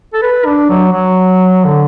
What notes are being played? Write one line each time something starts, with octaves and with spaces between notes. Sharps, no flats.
A4
B4
D4
F#3
F#3
D3